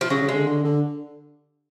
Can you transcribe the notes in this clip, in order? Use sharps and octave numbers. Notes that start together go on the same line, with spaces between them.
F3
C#3 F#3
C#3
G#3
D3
D3
D3